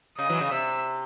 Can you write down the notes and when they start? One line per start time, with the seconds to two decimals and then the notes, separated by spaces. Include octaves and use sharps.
0.18 C#3 D#5
0.30 E3 F#3
0.40 C#3
0.51 C3 E5